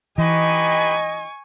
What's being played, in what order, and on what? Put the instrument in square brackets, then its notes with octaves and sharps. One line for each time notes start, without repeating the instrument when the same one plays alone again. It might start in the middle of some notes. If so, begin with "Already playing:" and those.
[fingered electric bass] E3 [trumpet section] D#4 G4 B4 [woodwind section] D#5 [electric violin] G#5 C#6